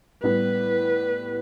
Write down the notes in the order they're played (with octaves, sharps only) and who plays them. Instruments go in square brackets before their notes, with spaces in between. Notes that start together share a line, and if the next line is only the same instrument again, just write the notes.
[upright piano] A2 G3 B3 [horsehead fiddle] B4